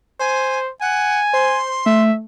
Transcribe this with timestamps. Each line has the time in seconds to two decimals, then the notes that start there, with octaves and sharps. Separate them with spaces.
0.20 C5 G#5
0.81 F#5 G#5
1.33 C5 C6
1.86 A3 E5